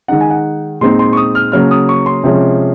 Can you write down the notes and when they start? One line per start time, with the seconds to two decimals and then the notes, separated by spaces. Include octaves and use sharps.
0.08 D#3 G#3 D#4 F#5
0.21 G#5
0.30 F#5
0.81 A#2 G#3 C4 D#4 C6
0.99 C6
1.13 C#6
1.17 D#6
1.35 F6
1.52 C#3 F#3 A#3 C#4 F6
1.71 D#6
1.89 C#6
2.06 C6
2.24 C3 F3 G#3 C#4